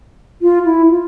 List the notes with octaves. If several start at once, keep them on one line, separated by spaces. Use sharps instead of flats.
F4
E4
F4